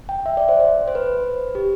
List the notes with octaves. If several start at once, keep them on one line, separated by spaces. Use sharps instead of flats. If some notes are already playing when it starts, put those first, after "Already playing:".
G5
E5
D5
C5
C5
C5
B4
G4